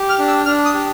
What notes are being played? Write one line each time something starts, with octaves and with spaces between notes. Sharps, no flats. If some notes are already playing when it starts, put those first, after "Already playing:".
Already playing: G4
F6
D4
E6
D4 F6
D#6
G4